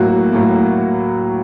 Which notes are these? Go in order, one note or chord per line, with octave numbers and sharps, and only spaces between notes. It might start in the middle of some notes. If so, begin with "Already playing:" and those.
Already playing: A2 F#3 A#3 F#4
A2 F#3 A#3